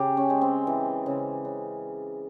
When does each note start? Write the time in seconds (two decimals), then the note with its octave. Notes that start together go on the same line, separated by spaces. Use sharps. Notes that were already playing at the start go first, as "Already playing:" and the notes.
Already playing: C#3 G4
0.17 C#4
0.30 G#3
0.41 C4
0.67 E3
1.06 C#3
1.45 C#3